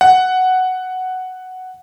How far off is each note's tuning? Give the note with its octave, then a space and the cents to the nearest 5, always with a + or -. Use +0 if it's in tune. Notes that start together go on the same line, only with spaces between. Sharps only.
F#5 +5